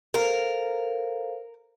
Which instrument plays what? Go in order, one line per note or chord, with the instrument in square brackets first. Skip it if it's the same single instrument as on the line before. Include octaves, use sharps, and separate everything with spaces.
[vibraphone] A4 C5 F5 [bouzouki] A#4